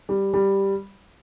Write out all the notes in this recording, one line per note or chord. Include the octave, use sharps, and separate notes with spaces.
G3
G3